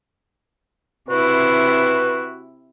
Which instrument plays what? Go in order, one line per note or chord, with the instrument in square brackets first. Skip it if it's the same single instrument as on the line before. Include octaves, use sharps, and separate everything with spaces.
[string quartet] C3 E4 [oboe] F#4 [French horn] B4